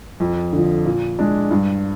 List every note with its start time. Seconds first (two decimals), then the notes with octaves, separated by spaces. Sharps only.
0.20 F2
0.53 D3 F3
0.85 A#2
1.19 G#3 D4
1.51 G2